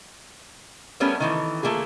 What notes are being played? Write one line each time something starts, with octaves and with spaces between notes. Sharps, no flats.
G3 A3 B3 C#4 A#4 C#5
D#3 E3 A3
A3 A#3 F4 G#4